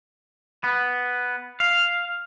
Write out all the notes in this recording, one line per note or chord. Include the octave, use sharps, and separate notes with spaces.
B3
F5